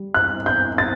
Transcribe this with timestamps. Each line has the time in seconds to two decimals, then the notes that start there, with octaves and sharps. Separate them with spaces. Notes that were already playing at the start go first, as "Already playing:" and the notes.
Already playing: G3
0.14 F#6
0.46 G6
0.78 A6